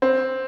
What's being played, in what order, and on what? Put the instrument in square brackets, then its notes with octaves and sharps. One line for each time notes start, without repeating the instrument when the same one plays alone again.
[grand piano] C4